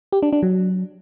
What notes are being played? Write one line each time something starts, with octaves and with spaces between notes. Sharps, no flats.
G4
D4
D4
F#3